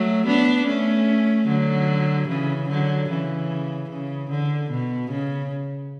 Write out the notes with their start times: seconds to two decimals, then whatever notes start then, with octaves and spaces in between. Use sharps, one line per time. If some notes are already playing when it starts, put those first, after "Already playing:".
Already playing: F#3 A3
0.26 B3 D4
0.67 A3 C#4
1.48 D3 F#3
2.28 C#3 E3
2.69 D3 F#3
3.09 C#3 E3
3.89 C#3
4.30 D3
4.70 B2
5.11 C#3